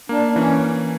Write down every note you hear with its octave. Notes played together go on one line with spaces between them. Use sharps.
A#3 D4
E3 C#4